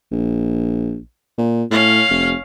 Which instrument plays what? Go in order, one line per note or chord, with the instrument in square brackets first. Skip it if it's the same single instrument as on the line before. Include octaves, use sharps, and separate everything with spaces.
[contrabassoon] A#1
A#2
[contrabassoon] A2 [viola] C#4 F5
[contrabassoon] F1